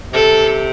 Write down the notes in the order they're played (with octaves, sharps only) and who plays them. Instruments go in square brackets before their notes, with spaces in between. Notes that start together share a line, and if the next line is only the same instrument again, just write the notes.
[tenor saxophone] C3 [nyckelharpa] A4